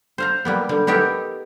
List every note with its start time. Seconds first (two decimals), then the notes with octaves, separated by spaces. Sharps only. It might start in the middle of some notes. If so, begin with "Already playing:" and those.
0.18 C5 F5 A#5
0.45 G3 A#3 B3
0.69 D3 G3
0.87 B3 D#4 G4 A4 A#4